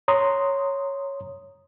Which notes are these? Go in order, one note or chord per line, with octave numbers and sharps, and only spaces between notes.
C#5 A#5 C6 D#6